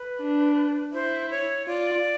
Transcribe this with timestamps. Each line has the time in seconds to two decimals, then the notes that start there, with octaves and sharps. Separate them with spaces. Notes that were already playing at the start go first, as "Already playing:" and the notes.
Already playing: B4
0.21 D4
0.93 E4 C5
1.30 C#5
1.67 F4 D5